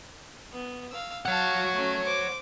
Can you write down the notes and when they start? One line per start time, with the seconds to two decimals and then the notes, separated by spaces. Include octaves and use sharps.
0.52 B3
0.91 F5 E6
1.26 C#5 F5 F#5 A5
1.74 A3 C#4
2.05 C5 D6